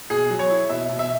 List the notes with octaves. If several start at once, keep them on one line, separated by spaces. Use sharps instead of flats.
B2 G#4
F#3
C#5
E4
B2 E5
B2
E5